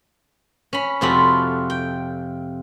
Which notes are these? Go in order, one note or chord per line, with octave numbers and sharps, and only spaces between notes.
C#4 B5
F2 C3 F4 F#4 A4 B5
G5